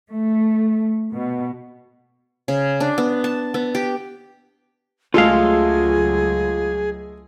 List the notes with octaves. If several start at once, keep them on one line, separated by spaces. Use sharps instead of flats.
A3
B2
C#3
D4
B3
A5
B3
G4
C#2 F#3 G#3 A3 F4 G#4 A4 F5